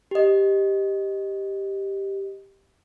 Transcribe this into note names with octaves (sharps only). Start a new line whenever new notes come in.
G4 D#5